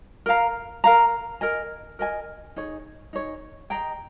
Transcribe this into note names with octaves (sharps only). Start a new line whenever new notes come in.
A#4 F5 A#5
A#4 F5 A#5
A#4 D#5 G#5
A#4 D#5 G#5
D#4 G#4 C#5
D#4 G#4 C#5
G#4 D#5 G5 A#5